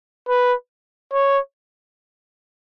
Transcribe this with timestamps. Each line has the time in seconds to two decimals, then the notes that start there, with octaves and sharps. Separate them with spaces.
0.28 B4
1.13 C#5